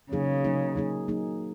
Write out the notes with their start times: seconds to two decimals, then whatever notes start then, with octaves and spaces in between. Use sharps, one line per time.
0.12 C#3 F#3 A#3 D#4 G#4
0.44 F#3 A#3 D#4 G#4
0.76 F#3 A#3 D#4 G#4
1.08 F#3 A#3 D#4 G#4